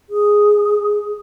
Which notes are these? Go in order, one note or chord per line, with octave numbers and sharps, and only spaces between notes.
G#4